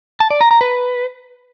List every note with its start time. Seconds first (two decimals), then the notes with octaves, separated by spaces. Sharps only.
0.20 A5
0.30 D5
0.41 A#5
0.51 A#5
0.61 B4